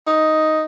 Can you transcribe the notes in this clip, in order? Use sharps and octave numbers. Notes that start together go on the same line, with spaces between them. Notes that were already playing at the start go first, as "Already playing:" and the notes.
D#4